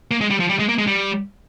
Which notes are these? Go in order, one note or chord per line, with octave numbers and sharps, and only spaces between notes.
A#3
G#3
G3
F3
G3
G#3
A#3
G#3
G3